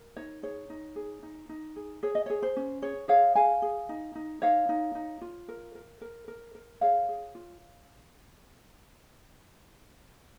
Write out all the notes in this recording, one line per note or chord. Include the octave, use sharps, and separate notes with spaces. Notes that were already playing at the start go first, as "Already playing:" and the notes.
Already playing: A#4
D#4 C#5
G#4 C#5
D#4
G#4
D#4
D#4
G#4
G#4 C#5
D#5
G#4 C#5
C5
C#4
G#4 C#5
G#4 C#5 F5
G#4 F5 G#5
G#4
D#4
D#4
D#4 C#5 F5
D#4
D#4
F4
A#4
A#4
A#4
A#4
A#4
G#4 C#5 F5
G#4
F4